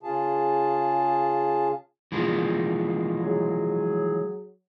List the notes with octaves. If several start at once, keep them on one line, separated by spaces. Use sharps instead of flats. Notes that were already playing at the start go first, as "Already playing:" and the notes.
C#3 F4 G#4 A5
E3 F3 G#3
F#3 G#4